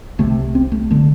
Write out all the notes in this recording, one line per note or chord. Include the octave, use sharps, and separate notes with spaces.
C2 C3 A3
C4
A3
D3 A3